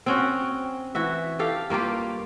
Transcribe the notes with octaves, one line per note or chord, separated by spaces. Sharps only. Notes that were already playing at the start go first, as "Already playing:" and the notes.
C4 C#4 F#4
E3 F#4 E5
G4 A4 F5
G2 A#3 F4 G4